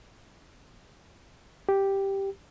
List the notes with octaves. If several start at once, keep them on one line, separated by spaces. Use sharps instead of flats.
G4